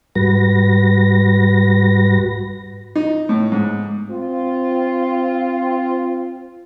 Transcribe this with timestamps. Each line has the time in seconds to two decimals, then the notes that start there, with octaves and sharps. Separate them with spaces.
0.15 G#2 G3 F#4 B4 A#6
2.95 D#4
3.29 A2
3.52 G#2
4.09 C4 F4